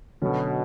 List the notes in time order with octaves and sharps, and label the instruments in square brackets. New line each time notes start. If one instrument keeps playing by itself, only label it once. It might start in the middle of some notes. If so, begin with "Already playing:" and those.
[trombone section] B2 [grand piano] D3 F#3 C#4 F#4 A4